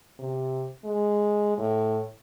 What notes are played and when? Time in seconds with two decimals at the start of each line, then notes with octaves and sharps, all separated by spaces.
0.19 C3
0.84 G#3
1.58 A2